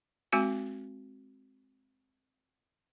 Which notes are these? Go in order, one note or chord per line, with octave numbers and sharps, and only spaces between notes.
G#3 C4 F#4 G#5